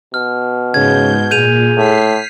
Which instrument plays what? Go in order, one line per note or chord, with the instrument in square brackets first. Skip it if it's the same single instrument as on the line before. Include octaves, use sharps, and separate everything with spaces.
[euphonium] B2 [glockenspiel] F6
[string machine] G#2 G6 [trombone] C#3 [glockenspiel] G#6
[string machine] A#2 [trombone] G#4 [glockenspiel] G6 D#7 F7
[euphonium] A2 [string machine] B6 C7